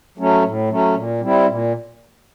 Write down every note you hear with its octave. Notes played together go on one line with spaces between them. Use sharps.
F#3 A3 C#4
A2
F#3 A3 C#4
A#2
G3 C4 E4
A#2